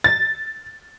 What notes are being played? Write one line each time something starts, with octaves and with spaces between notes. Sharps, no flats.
A6